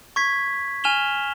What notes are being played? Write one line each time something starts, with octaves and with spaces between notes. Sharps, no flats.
C#6 G#6 B6
G#5 F6 E7 F7 G7